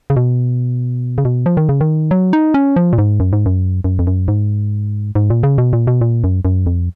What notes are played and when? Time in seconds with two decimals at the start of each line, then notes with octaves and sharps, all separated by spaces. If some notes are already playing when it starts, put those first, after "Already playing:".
0.10 C#3
0.16 B2
1.18 C#3
1.25 B2
1.46 F3
1.57 D#3
1.69 C#3
1.81 D#3
2.11 F#3
2.33 D#4
2.54 C#4
2.76 F3
2.93 A#2
2.98 G#2
3.20 F#2
3.33 G#2
3.46 F#2
3.84 F#2
3.99 F2
4.07 F#2
4.28 G#2
5.15 G#2
5.30 A#2
5.43 C#3
5.58 B2
5.73 A#2
5.87 B2
6.01 A#2
6.24 F#2
6.45 F#2
6.66 F2